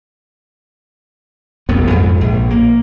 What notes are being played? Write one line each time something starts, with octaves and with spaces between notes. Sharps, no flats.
E1 F2 B3
F2 G#2
A#1
A#3